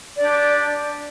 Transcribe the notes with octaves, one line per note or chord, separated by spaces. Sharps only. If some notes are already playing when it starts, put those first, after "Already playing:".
D4 G4 D5